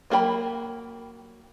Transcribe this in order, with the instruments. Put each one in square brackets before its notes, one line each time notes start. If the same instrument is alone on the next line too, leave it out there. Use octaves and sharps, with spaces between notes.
[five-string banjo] F#3 A#3 A4 G5 B5